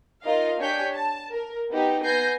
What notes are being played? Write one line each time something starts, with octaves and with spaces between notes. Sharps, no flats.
D#4 F4 A#4 D#5 F5
D4 G4 C#5 G#5 G6 B6
A5
A#4
B3 D#4 G4
B3 G#5 G6 A#6 C7